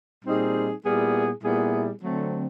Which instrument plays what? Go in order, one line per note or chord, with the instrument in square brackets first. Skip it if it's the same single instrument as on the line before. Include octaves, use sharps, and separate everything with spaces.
[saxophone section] A#2 G3 C4 D#4 G#4
A#2 G3 B3 E4 G#4
A#2 G3 B3 E4 G#4
D3 F#3 A3 C4